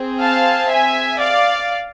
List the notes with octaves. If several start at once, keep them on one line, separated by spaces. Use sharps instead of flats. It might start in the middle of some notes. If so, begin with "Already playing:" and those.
Already playing: C4 G#4
F5 A5
E5 G#5
D5 F5